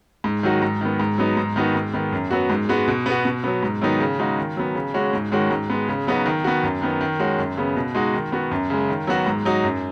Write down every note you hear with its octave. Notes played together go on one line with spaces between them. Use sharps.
G#2
D#3 F#3 D#4 F#4
G#2
D#3 B3
G#2
F#3 B3 D#4
G#2
D#3 B3 D#4 F#4
G#2
D#3 B3
F#2
F#3 B3 F#4
G#2
G#3 B3 F#4
B2
B3 F#4
B2
F#3 B3
G#2
D#3 F#3 B3 D#4
C#3
G#3 D#4 F#4
D#3
F#3 B3
C#3
G#3 C#4 F#4
G#2
D#3 G#3 C#4 F#4
G#2
G#3 B3
C#3
F#3 B3 D#4 F#4
D#3
B3 F#4
F#2
D#3 B3
D#3
G#3 C#4 F#4
F#2
C#3 B3
B2
G#3 D#4 F#4
D#3
B3 F#4
F#2
C#3 G#3
D#3
F#3 B3 F#4
G#2
F#3 D#4 F#4
F#2